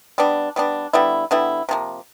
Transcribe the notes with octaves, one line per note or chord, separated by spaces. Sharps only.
G3 B3 D4
G3 B3 D4
D3 G3 B3 E4
D3 G3 B3 E4
C3 F3 A#3